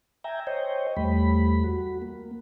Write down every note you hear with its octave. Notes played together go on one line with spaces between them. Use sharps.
E5 G5 G#5 A#5
C5 C#5 D#5 G5
E2 G3 A3 B5
F#4
A#3